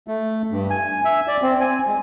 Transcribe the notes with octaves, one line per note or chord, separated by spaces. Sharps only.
A3
G2
G#5
E5
D5
C4
G#5
G#3